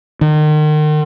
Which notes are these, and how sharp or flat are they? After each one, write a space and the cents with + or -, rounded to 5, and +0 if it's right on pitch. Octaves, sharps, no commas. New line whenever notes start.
D#3 -35